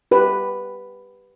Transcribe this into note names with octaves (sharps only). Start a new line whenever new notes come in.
G4 B4